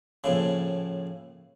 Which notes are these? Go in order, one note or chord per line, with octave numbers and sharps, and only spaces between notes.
A#1 A2 C#3